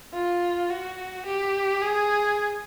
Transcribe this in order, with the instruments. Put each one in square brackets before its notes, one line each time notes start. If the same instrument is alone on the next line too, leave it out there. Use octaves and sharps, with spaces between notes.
[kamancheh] F4
F#4
G4
G#4